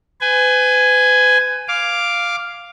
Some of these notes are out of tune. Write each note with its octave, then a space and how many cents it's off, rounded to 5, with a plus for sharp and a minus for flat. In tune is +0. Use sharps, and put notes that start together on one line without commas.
B4 +40 G#5 +0
F5 +0 D6 +0